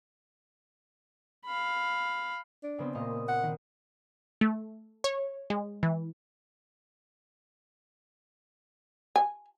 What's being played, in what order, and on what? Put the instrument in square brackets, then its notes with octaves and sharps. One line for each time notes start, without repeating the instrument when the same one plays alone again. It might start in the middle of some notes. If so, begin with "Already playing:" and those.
[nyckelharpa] F5 B5
[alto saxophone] D4
[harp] C#3 B3 C4
[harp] A#2 D#5 [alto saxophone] A#3
[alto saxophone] F#5
[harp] D#3
[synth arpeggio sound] A3
C#5
G#3
E3
[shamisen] G#5